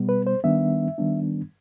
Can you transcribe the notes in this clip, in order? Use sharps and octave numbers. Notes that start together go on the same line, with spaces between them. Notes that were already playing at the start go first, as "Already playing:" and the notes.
Already playing: B2 G3 B3
B4
C5
D#3 G3 B3 D4 E5
D#3 G3 B3 D4